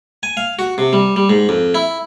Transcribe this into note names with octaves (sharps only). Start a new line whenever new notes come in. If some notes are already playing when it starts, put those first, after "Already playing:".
G#5
F5
F#4
C3
G3
G3
G#2
F2
E4